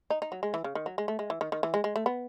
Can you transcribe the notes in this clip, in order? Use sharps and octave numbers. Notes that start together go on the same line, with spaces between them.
D#4
D#4
F#3
G#3
E3
C#3
D#3
F#3
G#3
A3
G#3
E3
D#3
D#3
E3
G#3
G#3
A3
B3